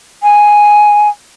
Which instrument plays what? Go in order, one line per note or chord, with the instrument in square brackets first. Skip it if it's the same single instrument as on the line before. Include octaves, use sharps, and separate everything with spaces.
[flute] G#5